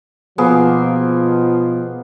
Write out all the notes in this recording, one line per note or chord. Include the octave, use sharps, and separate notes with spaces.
B2 F3 A#3 B3 G#4